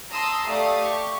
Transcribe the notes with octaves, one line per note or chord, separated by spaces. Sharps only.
A5 A#5 C6 D#6 E6
A3 G4 D5 F5 D#6
G4 C#6